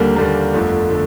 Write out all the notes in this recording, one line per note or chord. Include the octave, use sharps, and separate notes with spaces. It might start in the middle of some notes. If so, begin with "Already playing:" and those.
Already playing: D#2 D3 G3 A#3
D#2 D3 G3 A#3
G1 F2 D3 A3
D3 A3